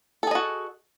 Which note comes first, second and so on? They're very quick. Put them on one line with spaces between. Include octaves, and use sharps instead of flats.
A4 G#4 D#5 F#4